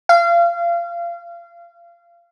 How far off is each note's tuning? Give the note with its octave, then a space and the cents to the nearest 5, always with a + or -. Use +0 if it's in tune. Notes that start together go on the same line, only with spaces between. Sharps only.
F5 -25